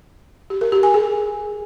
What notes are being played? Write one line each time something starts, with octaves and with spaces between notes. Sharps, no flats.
G4
A#4
G4
G#5
G#4